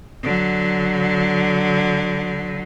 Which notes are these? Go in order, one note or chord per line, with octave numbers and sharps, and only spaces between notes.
D3 F#3